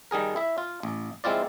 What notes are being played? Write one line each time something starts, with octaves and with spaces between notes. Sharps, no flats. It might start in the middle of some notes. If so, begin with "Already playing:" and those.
D#3 G3 G#4 A#4
E4 E5
F4
A1
G#3 C4 E4 F4 D5